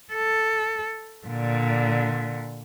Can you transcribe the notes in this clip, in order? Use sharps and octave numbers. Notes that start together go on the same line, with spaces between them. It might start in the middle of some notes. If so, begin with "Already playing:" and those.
A4
A#2 D3